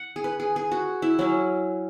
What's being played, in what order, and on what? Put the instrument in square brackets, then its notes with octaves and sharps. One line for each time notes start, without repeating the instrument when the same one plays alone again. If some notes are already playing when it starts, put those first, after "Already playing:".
Already playing: [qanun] F#5
G#4
B4
G#4
G#4
F#4
E4
F#3 C#4 E4